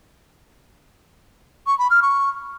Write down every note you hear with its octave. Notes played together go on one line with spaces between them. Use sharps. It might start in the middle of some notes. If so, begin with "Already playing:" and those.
C#6
B5
F6
C#6